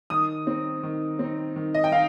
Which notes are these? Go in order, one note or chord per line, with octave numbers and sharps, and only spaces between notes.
D#3 D#6
C4 D#4
D#3
C4 D#4
D#3
D#5
G5
D#4 F5